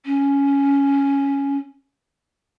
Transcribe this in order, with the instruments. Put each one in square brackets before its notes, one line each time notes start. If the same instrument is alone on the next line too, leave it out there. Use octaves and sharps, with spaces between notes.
[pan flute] C#4